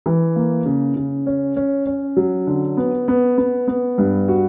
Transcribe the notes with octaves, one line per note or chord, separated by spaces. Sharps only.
E3
A#3
C#3
C#3
C#4
C#4
C#4
F#3
D3
B3
B3
B3
B3
G2
F#4